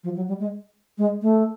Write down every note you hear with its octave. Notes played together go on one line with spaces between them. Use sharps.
F3
F#3
G3
G#3
G#3
A3